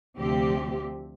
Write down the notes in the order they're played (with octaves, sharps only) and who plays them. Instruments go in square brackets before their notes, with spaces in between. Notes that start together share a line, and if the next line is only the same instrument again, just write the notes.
[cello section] D2 C3 F3 C4 G4